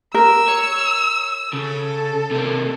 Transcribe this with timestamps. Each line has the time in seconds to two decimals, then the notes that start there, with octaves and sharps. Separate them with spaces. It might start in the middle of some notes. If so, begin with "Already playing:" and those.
0.14 A#4 E6
0.48 C#5
1.54 C#3 A4
2.31 C3 A#3